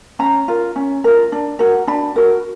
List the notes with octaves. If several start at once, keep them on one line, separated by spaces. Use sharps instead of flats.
C#4 A#5
F4 A#4
C#4
F4 A#4
D4
F#4 A#4
D4 B5
F#4 A#4